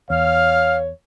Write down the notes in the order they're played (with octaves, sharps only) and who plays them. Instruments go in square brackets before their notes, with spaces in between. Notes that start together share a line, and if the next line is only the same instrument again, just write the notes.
[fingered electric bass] E2 [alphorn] C#5 [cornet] F5 [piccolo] F6